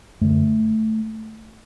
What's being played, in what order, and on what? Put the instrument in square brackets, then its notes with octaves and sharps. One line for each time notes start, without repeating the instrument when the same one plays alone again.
[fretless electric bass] F#2 D3 A3